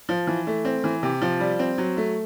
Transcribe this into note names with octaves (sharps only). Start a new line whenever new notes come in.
F3
E3
A3
C4
E3
C3
F3
G3
C4
F#3
A3